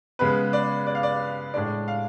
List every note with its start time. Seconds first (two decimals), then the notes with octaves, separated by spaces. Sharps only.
0.19 C#3 G#3 B3 B4
0.53 D5
0.87 D5
0.95 F5
1.03 D5
1.54 A2 G#3 D4 D5
1.88 F5